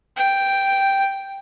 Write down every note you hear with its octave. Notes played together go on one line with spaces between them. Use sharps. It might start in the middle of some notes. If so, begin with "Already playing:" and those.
G5